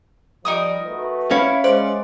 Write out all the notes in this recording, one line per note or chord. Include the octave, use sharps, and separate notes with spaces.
F3 G3 D#4 A#4 D#6
A3 F#4 B4
C#4 E4 C#5 F5
G#3 C5 D5